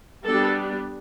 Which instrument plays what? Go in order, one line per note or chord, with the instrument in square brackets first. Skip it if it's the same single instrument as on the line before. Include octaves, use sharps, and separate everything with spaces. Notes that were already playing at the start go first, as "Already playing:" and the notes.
[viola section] G3 B3 D4 A4